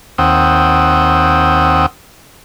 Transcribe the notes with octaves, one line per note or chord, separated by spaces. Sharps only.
D#2 C4 F#5 G5 D#6 E6